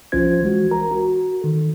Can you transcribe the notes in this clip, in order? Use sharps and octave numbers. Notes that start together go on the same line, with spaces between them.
C2 F3 C#4 F4 C5 G#6
E3 G#3 F#4
A#4 A#5
F#4
D#3 A4